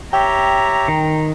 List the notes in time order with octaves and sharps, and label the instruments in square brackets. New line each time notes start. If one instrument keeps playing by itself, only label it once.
[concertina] G4 C#5 E5 [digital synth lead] G5 [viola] A#5
[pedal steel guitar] D#3